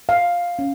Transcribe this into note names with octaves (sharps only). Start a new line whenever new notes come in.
F5
C#4